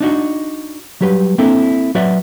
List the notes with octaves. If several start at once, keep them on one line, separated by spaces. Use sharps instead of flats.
D4 D#4 F#4
F#3 G3 G4 B4
A#3 C4 D4 E4 A4
F#3 F#4 B4 D5 E5